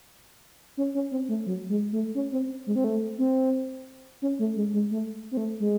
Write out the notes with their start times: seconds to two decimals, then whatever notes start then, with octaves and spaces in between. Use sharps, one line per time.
0.77 C#4
0.95 C#4
1.12 C4
1.29 A3
1.46 F#3
1.69 G#3
1.92 A3
2.15 C#4
2.32 C4
2.67 G#3
2.76 C4
2.84 A3
3.18 C4
4.22 C#4
4.39 A3
4.56 G#3
4.73 G#3
4.91 A3
5.31 C4
5.37 A3
5.60 G#3